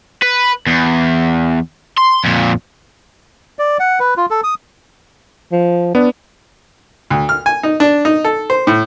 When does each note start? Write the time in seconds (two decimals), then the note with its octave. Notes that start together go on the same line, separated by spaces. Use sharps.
0.23 B4
0.67 E2
1.97 C6
2.24 F2 A#2
3.59 D5
3.80 F#5
4.00 B4
4.17 F4
4.31 A4
4.44 D#6
5.52 F3
5.95 B3 D4
7.10 D2
7.29 F6
7.46 G#5
7.63 D#4
7.80 D4
8.05 D#4
8.25 A4
8.50 C5
8.67 A2